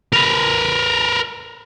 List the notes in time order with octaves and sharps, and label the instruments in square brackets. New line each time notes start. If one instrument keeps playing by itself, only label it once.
[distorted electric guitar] A#4 B4